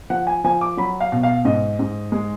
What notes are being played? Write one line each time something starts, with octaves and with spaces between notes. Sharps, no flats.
F3 F#5
G#5
F3 G#5
D6
F#3 B5
F5
B2
F5
G#2 D#5
G#2
G#3